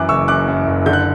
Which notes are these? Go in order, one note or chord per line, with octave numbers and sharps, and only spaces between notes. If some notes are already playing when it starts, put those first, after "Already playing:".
Already playing: F#2 E3 D6 F#6
F#1 C#6 E6
F#2 D6 F#6
F#2
F#1
D3 G6
F#6